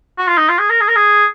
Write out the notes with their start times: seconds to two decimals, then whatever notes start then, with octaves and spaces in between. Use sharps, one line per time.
0.18 F#4
0.28 F4
0.37 D#4
0.49 F4
0.59 G#4
0.70 A#4
0.81 G#4
0.88 A#4
0.96 G#4